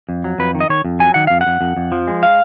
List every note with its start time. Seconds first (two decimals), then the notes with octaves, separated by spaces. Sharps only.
0.09 F2
0.24 F#3
0.39 F2 B4
0.55 D#3
0.60 D#5
0.69 D#3 C#5
0.85 F2
1.00 F#3 G#5
1.14 D#3 F#5
1.27 F2 F5
1.41 F#5
1.47 F2
1.61 F2
1.77 F2
1.92 F3
2.07 G#3
2.23 F5